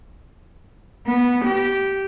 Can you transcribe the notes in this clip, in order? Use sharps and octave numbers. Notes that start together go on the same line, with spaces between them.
B3
G4